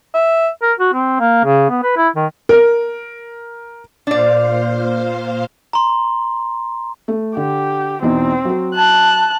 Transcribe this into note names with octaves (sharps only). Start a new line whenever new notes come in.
E5
A#4
F#4
C4
A#3
C#3
B3
B4
E4
D#3
A#4
A#2 D4 C5 D5 F5
A#5 C6
A3
D3 G4
E2 B2 C4 D#4
F#3 F#4
A5 F#6